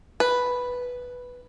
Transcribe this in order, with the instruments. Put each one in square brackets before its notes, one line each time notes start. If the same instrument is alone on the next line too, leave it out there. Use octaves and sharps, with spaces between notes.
[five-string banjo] B4